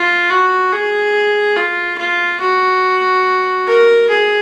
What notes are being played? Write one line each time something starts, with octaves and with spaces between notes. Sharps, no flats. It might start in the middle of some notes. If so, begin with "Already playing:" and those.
Already playing: F4
F#4
G#4
F4
F4
F#4
A#4
G#4